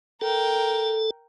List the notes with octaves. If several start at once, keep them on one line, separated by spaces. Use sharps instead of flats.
A4 A#4 G5